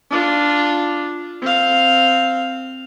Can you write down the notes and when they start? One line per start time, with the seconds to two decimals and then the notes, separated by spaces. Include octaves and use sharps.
0.10 D4 F4
1.42 C4 F5